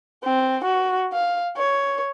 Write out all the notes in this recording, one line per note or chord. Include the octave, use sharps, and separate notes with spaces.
C4
F#4
F5
C#5